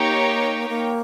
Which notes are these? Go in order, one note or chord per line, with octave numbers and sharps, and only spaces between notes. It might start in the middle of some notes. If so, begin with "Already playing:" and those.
Already playing: A#3 D#4 G4 C#5 G5
A#3